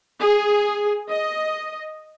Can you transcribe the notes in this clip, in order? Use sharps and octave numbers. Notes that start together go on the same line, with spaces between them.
G#4
D#5